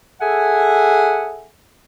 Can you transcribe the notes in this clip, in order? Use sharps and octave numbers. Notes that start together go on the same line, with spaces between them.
G#4 A4 E5 F#5 G#5